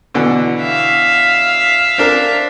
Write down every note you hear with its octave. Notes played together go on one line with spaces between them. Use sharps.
B2 D3 E3
E5 F5
C4 D4 A#4